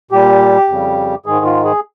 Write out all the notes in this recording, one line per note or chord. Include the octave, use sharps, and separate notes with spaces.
A#2 G3 G4
F2 C#3 G3
G#2 D#3 G#3 G#4
F4
G#4